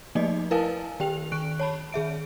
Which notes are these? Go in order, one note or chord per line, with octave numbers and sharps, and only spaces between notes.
F3 A3 A#3 D#4 D5 D#5
E4 A#4 B4 F5 G#5 A5
D#3 G4 G5 F7
D#3 C#6 F#6 D7
C#5 A5 B5
D#3 G#4 E5 D7